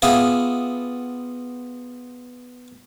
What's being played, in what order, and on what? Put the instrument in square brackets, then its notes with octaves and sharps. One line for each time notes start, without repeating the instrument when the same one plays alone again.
[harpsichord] B3 F4 G#4 E5 G5 D6